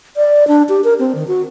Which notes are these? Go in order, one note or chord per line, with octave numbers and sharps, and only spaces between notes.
D5
D4
G4
A#4
C4
D#3
F#4